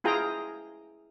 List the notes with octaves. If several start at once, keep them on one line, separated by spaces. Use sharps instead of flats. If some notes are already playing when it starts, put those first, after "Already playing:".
E4 F4 G#4 G5 A#5